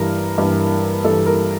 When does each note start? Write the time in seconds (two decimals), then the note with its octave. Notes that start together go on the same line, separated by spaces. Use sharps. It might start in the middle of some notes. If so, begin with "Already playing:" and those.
Already playing: G2 E3 A#4
0.38 G2 E3
1.05 G2 E3 A4
1.26 A#4